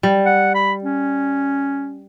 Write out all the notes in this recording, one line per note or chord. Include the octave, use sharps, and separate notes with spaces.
G3
F#5
B5
C#4